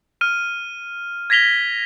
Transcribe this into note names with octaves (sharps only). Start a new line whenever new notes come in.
F6 D#7
G#6 A#6 B6 F7 G7